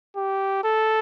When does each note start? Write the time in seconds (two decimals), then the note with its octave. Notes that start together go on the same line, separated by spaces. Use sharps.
0.17 G4
0.64 A4